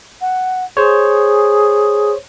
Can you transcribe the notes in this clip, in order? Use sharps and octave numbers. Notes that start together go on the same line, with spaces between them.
F#5
G#4 C5 C#5